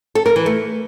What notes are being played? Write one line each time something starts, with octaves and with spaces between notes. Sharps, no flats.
A4
A#4
E3
A3